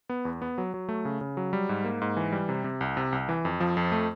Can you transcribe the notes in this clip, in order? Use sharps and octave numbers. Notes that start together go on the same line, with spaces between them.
B3
E2
B3
F#3
F#3
A3
C#3
C#3
F#3
G3
G#2
A#3
G#2
E3
G3
C3
C3
C2
C3
C2
E3
F2
F3
F2
A3